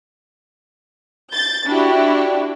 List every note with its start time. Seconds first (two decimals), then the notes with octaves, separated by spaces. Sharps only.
1.34 G6 A6
1.67 D4 E4 F#4 G4